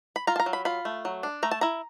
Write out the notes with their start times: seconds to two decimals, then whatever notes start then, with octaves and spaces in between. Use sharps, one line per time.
0.16 B5
0.27 F4 A#5
0.36 A5
0.40 A#5
0.46 F#3
0.53 B5
0.65 F4 B5
0.85 A3
1.05 F#3
1.23 D4
1.43 A3 A#5
1.51 A5
1.61 E4 A#5